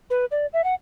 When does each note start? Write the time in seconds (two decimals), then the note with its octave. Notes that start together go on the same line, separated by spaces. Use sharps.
0.10 B4
0.31 D5
0.53 E5
0.64 F#5